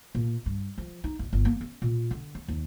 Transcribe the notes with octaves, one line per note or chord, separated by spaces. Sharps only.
A#2
G2
F3
D#4
F#1
G1
A#3
C#4
A#2
D3
C#4
D#2